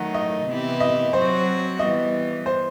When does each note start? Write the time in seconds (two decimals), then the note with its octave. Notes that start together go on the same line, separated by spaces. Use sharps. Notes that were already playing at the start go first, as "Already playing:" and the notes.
Already playing: D#3 F#3 A3 D#4 F#5
0.15 D#5
0.47 C3 E3 B3 E4 G4
0.80 D#5
1.13 F#3 C4 F#4 C5
1.79 E3 G3 B3 D#5
2.46 C5